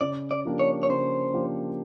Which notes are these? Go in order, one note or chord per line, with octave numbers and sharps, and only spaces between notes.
C#3 D5
D5
F3 A#3 D4 G4
C#5
C#5
C#3 C5
F3 A#3 D4 G4